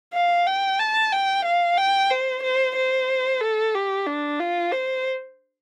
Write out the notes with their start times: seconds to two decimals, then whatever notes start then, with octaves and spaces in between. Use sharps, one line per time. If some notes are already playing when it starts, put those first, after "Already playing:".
0.14 F5
0.47 G5
0.79 A5
1.12 G5
1.45 F5
1.77 G5
2.10 C5
2.43 C5
2.76 C5
3.41 A4
3.75 G4
4.07 D4
4.40 F4
4.72 C5